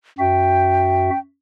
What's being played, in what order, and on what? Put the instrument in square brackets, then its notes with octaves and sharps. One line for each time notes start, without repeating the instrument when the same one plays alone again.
[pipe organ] F#2 F#4 E5 [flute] G5